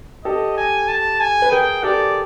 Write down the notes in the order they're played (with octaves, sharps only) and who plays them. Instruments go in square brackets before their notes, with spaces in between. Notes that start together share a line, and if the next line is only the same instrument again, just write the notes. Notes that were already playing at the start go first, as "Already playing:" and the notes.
[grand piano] G4 A4 [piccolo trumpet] D#5
[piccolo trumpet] G#5
A5
G#5
[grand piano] B4
[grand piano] G#4 A#4 [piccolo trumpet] G5
[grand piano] G4 A4 [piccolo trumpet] D5